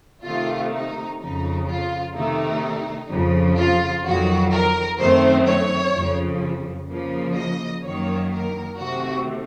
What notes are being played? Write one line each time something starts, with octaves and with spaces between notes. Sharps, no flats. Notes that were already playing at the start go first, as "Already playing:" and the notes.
C3 D#3 A3 F4
D#4
F2 C#3 F3 D#4
F4
C3 D#3 A3 D#4
F2 C#3 F3
F4
F2 D#3 F#3 F#4
A#4
F#2 D#3 A3 C4 C5
C#5
F2 C#3 F3
C#3 F3 A#3
D#5
F#2 D#3 F#3 A#3 C#5
A#4
C3 D#3 A3 C4 F#4